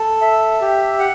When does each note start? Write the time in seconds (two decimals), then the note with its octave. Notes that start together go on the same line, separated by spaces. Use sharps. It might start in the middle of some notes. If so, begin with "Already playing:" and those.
Already playing: A4
0.22 E5
0.61 G4
1.00 F#5